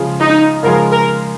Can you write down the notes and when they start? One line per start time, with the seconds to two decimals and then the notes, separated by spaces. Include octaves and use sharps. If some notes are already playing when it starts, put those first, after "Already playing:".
Already playing: C#3 F3 G#3 F4 G#4
0.20 D#4
0.63 C#3 F3 G#3 F4 G#4 A#4
0.91 A#4